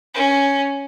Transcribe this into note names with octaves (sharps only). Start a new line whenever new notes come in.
C#4